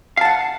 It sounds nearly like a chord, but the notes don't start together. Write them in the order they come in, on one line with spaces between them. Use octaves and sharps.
F5 A5 F#5